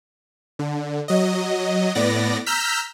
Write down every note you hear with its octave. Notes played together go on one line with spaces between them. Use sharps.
D3
F#3 D#5
A2 B3 D5 A#6
A#5 E6 F6 G6 B6